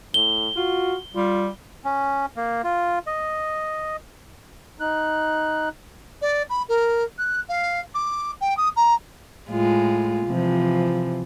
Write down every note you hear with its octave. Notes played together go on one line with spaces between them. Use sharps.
A2 G7
F4 F#4
G3 F4
C#4
A#3
F4
D#5
D#4 F#6
D5
B5
A#4
F#6
F5
D6
G5
D#6
A#5
A2 G#3 F4
C3 E3 F3